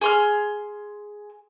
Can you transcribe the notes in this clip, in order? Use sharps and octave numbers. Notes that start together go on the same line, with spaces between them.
G#4 C6 F6